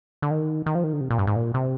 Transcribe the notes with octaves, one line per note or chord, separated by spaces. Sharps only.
D3
D#3
D#3
F3
D#3
D3
C3
A#2
G2
G#2
A#2
C3